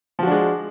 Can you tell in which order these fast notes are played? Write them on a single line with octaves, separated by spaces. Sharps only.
F3 F#4 D4 G#3